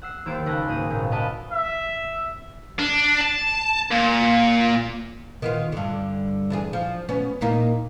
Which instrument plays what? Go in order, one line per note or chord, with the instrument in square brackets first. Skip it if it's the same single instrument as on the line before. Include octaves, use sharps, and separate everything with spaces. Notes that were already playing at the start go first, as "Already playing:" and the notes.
[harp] F#5 E6 C7
D#2 A#3 C5 E6 A6 D7
C#2 A4 B4 G#5 F#6 A#6
G#1 A#3 G#4 D#6
G#1 C#2 A#2
A#4 D#5 F5 F#5 A5 B5
[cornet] E5
[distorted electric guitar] D4
A5
A#2
[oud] D#3 B3 F4
G2 D3
E2 D4 G#4
F3
B3 C#4
A#2 A#3 D#4